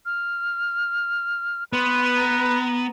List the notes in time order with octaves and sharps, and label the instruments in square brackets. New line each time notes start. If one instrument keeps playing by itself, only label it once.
[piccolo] F6
[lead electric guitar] B3 [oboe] B4 [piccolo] C6
[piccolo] A#5